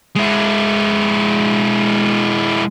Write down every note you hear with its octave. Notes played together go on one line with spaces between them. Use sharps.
G#3 E4